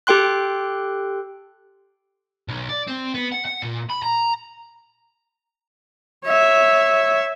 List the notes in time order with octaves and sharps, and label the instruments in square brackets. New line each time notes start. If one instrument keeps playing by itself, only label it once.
[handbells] G4 A4 G5 C6 F#6
[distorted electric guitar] B1
D5
C4
B3
F#5
F#5
A#2
B5
A#5
[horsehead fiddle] C#5 E5